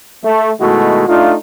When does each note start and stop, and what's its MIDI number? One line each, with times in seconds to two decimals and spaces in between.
0.23 0.49 57
0.60 1.07 47
0.60 1.07 51
0.60 1.07 56
0.60 1.07 57
0.60 1.07 64
0.60 1.07 66
1.07 1.33 57
1.07 1.33 62
1.07 1.33 63
1.07 1.33 65